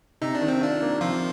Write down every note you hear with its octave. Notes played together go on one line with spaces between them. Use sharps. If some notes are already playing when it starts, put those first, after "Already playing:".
C3 D#4
D4
D#3
C4
D4 F4
A#3
C3 F3 F4